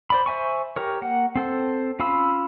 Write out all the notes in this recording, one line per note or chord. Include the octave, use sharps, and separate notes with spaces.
C5 D5 B5
C5 E5 G#5 C#6
G4 A#4 C#5
A#3 F#5
C4 A4 C5
C#4 F4 F5 B5 E6